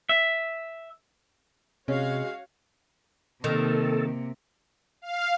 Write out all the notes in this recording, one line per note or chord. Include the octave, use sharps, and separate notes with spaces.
E5
C3 G#3 C#4 F#4 C#5 F5
C3 D#3 A#3 A4
F5